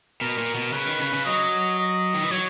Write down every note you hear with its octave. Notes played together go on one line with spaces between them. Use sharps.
B2 A#4
A#2
B2
C#3 B4
D#3
C#3
C#3
F#3 D#5
D#5
D#3
E3
F#3 C#5